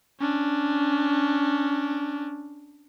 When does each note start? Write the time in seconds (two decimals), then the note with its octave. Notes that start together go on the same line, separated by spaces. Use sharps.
0.20 C#4 D4